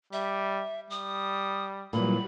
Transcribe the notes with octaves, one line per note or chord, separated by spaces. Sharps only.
G3 E5
G3 D#6
A#2 E3 F#3 G3 B5